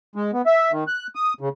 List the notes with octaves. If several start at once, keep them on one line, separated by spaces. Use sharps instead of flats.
G#3
B3
E5
D#3
F#6
D#6
C#3